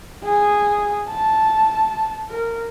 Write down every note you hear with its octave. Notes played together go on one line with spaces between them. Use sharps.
G#4
A5
A#4